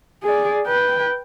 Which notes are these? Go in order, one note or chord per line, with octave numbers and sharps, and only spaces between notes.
G#4 D5
B4 G5